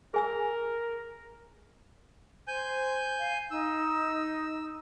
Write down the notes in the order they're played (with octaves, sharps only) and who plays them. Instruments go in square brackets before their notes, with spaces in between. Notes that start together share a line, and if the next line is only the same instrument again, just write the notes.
[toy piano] G#4 G#5 E6 [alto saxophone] A#4
[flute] C5 [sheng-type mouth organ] G#5 G6
[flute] F5
[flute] D#4 [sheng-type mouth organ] E6